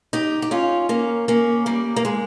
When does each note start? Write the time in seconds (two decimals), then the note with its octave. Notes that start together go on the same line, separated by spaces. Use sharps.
0.13 D#4 G4
0.42 G4
0.51 C#4 F4
0.89 A#3 C#4
1.28 A#3 C#4
1.66 G3 A#3
1.96 A#3
2.05 G#3